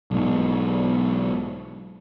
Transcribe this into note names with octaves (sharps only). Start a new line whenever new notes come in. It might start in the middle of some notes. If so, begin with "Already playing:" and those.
B1 G#2